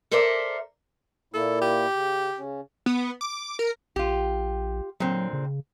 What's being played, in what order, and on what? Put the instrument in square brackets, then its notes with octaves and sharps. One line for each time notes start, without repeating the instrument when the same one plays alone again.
[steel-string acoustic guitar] A4 A#4 C5 D5 E5
[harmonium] A#2 A#3 E4 [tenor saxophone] A4
[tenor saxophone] G4
[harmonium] C#3
C#3 C#4
[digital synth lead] B3
D6
A#4
[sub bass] A#1 [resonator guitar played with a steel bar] F4 G4
[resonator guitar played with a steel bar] A#2 D3 C4 [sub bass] F#3
[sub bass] C#3